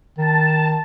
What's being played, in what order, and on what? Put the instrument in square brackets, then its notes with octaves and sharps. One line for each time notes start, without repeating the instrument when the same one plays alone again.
[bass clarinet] D#3 [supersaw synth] A5